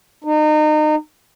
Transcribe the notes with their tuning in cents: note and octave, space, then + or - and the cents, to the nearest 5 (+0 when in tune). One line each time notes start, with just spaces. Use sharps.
D#4 -30